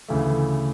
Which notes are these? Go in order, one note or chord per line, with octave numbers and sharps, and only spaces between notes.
D2 C#3 E3 A3